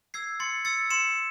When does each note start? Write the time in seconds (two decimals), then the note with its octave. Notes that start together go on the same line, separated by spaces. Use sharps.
0.14 E6 G#6 C7
0.40 C6 A6 C#7
0.65 E6 A6 C#7
0.90 C6 C#7 E7